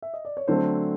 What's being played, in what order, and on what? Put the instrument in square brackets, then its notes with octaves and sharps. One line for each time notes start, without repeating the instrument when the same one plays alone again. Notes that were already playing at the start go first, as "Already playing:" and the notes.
[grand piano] E5
D#5
D5
C#5
D3 F#3 A3 C4 C5